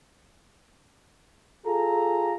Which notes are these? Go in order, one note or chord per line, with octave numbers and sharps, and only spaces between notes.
F4 G#4 A4 A#5